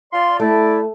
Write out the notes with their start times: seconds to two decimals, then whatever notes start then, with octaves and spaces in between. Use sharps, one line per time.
0.13 F4 D5 C6
0.40 A3 E4 D5